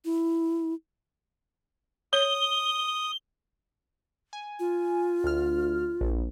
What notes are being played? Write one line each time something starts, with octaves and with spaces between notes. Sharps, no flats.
E4
C#5 D#6 G7
G#5
F4
D2 F6
A#1